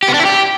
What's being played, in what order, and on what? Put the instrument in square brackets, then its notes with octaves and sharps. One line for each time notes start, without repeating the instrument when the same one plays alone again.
[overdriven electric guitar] G4
B3
D4
E4
G4